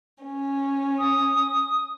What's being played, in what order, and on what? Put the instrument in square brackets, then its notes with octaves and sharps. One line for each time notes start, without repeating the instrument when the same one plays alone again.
[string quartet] C#4
[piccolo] D#6